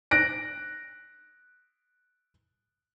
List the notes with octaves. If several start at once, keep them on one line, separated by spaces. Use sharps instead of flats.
F#6 A#6 D7